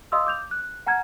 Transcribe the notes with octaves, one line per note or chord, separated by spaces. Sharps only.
D#5 F5 C6 D#6 E6
D6 G6 F7
F#6
F#5 G#5 A#5 F6 G#6